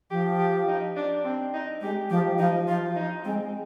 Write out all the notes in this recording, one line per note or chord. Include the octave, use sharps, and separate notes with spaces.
F3 G4
G4
D#4
D4
C4
D#4
G#3 G4
F3 G4
F3 D#4
F3 F4
D#4
G#3 C4